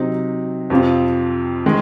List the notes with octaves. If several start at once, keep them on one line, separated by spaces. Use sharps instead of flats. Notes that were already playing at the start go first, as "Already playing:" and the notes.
Already playing: C3 F#3 C4 D#4
F2 C3 F3 C4 F4
D#3 G#3